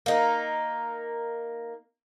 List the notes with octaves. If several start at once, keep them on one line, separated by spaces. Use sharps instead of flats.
A#3 D#4